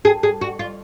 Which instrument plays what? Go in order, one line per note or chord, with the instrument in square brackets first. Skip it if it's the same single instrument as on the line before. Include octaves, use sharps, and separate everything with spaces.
[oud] G#4
G#4
F#4
F4